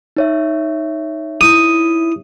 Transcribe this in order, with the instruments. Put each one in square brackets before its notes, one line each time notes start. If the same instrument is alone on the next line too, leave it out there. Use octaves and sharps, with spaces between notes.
[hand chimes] D#4 C#5 E5
[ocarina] E4 [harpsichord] D#6